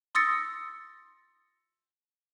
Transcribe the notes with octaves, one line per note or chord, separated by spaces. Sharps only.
C6 D#6 E6 A6 A#6 C#7